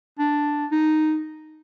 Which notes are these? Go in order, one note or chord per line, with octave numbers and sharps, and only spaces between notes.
D4
D#4